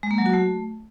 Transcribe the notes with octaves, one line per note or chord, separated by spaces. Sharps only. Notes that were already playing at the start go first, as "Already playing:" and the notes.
G#3
A#3
F#3
F#4
A3